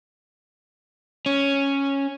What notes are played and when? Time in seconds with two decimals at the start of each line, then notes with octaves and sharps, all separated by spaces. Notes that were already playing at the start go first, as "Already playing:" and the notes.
1.26 C#4